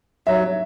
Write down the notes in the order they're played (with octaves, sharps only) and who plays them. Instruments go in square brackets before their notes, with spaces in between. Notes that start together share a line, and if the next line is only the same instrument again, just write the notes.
[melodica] F#3 [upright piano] E5